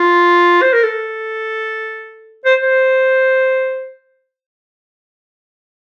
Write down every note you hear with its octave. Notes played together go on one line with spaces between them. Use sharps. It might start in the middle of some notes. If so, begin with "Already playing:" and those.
Already playing: F4
C5
A#4
A4
C5
C5